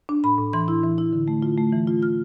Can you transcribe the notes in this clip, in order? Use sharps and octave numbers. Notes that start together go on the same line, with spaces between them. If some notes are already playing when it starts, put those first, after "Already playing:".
D4
A2 B5
A2
E3 C6
E4
E3
E4
D3
A3
F4
A3
E3
F4
F4 F6